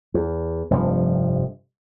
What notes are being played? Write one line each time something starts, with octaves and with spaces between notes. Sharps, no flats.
E2
F1 G2 F3